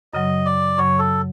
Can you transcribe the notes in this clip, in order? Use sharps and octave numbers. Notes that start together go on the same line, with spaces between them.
F#2 C#3 F#3 D#5
D5
F#2 C#3 F#3 C#5
A4